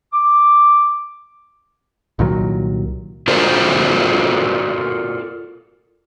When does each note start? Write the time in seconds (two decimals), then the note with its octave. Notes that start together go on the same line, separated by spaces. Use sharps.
0.13 D6
2.19 C2 A#2 D#3 F#3
3.28 F4 F#4 A4 A#4 C5 D5